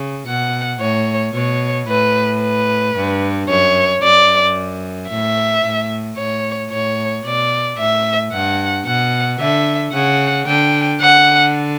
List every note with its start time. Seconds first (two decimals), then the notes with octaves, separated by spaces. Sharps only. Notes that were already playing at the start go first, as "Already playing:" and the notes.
Already playing: C#3
0.27 B2 F#5
0.80 A2 C#5
1.34 B2 C#5
1.88 A2 B4
2.42 B4
2.96 G2
3.49 F#2 C#5
4.03 F#2 D5
5.10 A2 E5
5.65 A2
6.18 A2 C#5
6.72 A2 C#5
7.25 B2 D5
7.79 A2 E5
8.33 G2 F#5
8.86 B2 F#5
9.40 D3 E5
9.93 C#3 F#5
10.47 D3 G5
11.01 D3 F#5